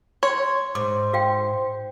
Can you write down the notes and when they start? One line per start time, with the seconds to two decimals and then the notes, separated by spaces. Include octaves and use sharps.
0.23 C#5 C6
0.75 G#2 C5 D6
1.13 F#4 F5 G5